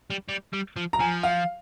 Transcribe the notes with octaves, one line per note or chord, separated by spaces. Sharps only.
G3
G3
G3
F3
A#5
F3 G#5
F5